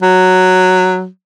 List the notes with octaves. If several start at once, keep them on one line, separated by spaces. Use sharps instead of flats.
F#3